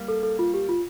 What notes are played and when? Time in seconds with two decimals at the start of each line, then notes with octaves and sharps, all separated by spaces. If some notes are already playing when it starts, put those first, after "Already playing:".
Already playing: G3 A#3
0.08 A4
0.23 A4
0.39 F4
0.54 G4
0.69 F4